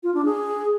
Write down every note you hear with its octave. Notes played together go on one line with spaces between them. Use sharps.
F4
D4
G#4